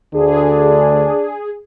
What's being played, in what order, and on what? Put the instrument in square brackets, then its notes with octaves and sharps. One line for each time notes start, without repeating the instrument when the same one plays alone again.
[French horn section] D2 D3 [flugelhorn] D4 [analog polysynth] G#4